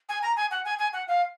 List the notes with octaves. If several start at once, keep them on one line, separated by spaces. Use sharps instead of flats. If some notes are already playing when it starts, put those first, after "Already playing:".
G#5
A#5
G#5
F#5
G#5
G#5
F#5
F5